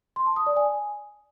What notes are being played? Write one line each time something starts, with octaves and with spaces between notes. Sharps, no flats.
C6
A5
D#6
D5
G#5